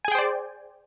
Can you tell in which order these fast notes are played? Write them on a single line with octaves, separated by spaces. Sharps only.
G#5 G#4 G5 C5 D5